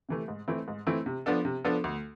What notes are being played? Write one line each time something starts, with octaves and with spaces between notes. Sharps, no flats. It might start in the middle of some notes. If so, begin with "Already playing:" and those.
C3 E3 A3
G#2
E3 A3 C4 E4
G#2
E3 A3 C4 E4
C3
F3 B3 D4 A4
C3
F3 B3 D4 A4
D2